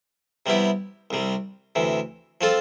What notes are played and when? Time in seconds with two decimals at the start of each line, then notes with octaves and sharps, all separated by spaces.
0.46 C3 G3 B3 E4 G4
1.11 C2 C3 G3
1.75 D2 C3 E3
2.41 F3 C4 F4 A4